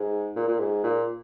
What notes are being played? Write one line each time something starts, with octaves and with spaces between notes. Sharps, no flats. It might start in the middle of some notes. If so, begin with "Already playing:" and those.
Already playing: G#2
A#2
A#2
G#2
A#2